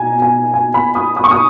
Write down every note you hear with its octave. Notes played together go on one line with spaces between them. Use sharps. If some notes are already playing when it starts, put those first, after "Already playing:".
Already playing: B2 G#5 A#5
G#5
G#5
B5
D#6
D#6
C#6
D#6